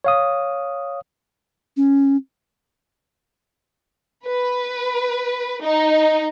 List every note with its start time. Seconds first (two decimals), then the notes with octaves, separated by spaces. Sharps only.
0.04 C#5 F5 D#6
1.77 C#4
4.28 B4
5.63 D#4